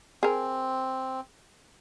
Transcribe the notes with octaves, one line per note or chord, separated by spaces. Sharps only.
C4 G#4 A#4